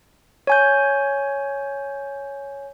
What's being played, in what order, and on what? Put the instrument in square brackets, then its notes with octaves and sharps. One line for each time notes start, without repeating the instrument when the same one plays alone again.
[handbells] C#5 G#5 G6